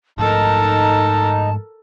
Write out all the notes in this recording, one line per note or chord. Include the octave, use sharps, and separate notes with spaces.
G#2 F3 A3 D#4 A4 A#4 A5